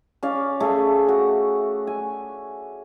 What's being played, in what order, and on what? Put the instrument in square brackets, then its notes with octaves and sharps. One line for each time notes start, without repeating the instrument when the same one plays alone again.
[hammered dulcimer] C#4 D5 F5
A3 G#4 E5
F#4
G#5